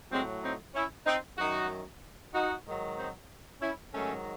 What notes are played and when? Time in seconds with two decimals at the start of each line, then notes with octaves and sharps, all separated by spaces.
0.11 A2 F#3 G#3 C4
0.43 C4 D#4
0.75 C#4 E4
1.07 C4 D#4
1.38 F#2 D#3 F#3 D#4 F#4
2.34 D#4 F#4
2.66 G#2 D#3 F#3
2.98 C4 D#4
3.61 C#4 E4
3.93 G#2 D#3 F#3 A3 C#4